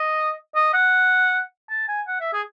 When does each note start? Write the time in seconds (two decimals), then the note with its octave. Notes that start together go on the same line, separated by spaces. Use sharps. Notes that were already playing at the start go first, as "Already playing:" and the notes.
Already playing: D#5
0.55 D#5
0.74 F#5
1.70 A5
1.88 G#5
2.07 F#5
2.21 E5
2.33 G#4